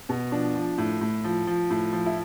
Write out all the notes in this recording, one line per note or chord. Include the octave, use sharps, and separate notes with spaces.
B2
F3 D4
F3
A2
A2
F3
F3
A2
F3
E4